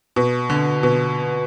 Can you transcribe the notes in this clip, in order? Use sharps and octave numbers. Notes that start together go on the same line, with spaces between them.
B2
D3
B2